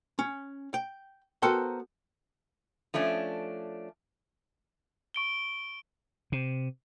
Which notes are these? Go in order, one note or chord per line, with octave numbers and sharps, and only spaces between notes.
C#4
G5
B3 F#4 A4 A#4 C5 G5
F3 A3 C#4 D4
C#6 D7 G7
C3